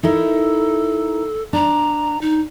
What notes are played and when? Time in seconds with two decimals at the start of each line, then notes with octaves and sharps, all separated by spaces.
0.03 D#4 E4 A4 A#4
1.53 D4 A#5
2.21 D#4